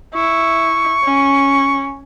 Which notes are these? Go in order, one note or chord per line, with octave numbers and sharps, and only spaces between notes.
E4 C#6
C#4